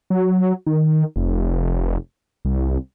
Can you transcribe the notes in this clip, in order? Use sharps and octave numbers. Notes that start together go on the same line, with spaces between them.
F#3
D#3
F1
C2